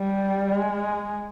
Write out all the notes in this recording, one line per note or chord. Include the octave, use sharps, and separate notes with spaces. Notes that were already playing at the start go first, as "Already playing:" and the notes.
Already playing: G3
G#3